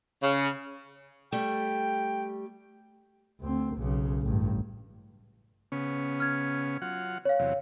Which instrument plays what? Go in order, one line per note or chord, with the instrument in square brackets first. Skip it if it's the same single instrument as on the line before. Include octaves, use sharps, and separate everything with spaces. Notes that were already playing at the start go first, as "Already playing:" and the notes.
[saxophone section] C#3
[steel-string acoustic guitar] G3 A3 [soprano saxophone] G5
[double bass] D2 C4
B1 C#3
A1 G2
[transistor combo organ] C#3 B3 C#4
[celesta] F6 G#6
[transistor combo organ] F#3 F4 F#5
[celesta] C#5 F5
[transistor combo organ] E2 C3 F#3